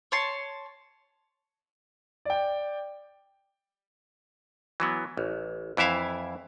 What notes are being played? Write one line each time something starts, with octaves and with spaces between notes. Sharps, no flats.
C#5 A5 C6
D5 G5
E3 F#3 B3
A1
F2 E3 E4 E5 F5